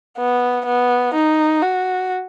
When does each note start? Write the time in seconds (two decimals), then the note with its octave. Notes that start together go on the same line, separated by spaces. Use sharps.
0.18 B3
0.66 B3
1.14 D#4
1.62 F#4